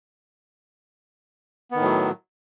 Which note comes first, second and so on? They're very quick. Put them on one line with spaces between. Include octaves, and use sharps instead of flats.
B3 D#3 A2 F#3